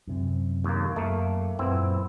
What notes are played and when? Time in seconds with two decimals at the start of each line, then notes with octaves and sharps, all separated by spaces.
0.07 F#2 C3
0.64 D#2 A#3
0.96 F#2 A3 A#3
1.59 F#2 A#2 B3 C4 E4